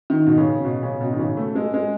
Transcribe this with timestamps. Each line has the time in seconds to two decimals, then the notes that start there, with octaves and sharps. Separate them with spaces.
0.10 D#3
0.27 B2
0.38 C#3
0.65 B2
0.83 C#3
1.01 B2
1.13 D#3
1.19 C#3
1.37 A3
1.55 G#3
1.74 G#3